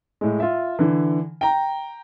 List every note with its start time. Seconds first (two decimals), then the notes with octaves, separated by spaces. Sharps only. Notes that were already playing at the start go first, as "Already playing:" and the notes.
0.21 A2 G#3
0.40 F4 E5
0.79 D3 E3
1.41 G5 A#5